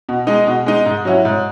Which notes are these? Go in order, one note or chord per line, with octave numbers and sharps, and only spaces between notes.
B2
G#3 D#4
B2
G#3 D#4
G#2
F#3 C#4 E4
G#2